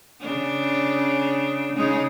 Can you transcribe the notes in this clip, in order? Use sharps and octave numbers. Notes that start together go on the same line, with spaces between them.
C#3 D4
C#3 G#3 D#4